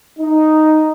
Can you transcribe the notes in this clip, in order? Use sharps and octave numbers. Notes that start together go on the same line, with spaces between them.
D#4